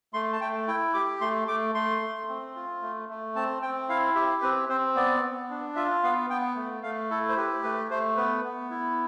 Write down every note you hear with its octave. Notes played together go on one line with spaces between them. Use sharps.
A3 C6
A5
A3 G5
E4 G5
G4 D6
A3 C6
A3 D6
A3 C6
A3
C4
F4
A3
A3
C4 A5
C4 G5
E4 F5
G4 E5
C4 B4
C4 C5
B3 D5
B3
D4
F4 E5
B3 F5
B3 G5
A3
A3 F5
E4 A4
C5
G4 B4
A3 B4
A3 C5
B3 B4
B3
E4